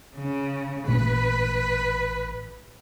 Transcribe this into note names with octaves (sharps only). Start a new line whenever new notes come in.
C#3
A1 A#2 A3 B4